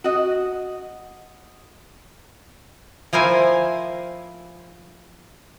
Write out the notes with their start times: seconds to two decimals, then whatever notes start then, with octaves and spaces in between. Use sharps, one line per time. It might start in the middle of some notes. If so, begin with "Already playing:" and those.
0.04 F#4 D#5
3.13 F3 E4 A#4 C5 G#5